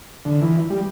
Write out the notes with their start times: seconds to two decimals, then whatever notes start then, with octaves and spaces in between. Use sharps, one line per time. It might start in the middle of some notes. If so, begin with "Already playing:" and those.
0.25 D3
0.42 E3
0.70 G3